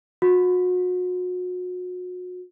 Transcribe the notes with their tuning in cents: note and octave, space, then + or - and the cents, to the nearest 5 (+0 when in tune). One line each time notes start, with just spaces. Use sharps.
F#4 -35